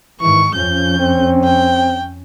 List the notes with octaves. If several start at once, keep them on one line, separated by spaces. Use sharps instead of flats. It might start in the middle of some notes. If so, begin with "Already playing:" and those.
G#2 D#3 E3 C#6
F2 F3 C#4 G6
C4
G5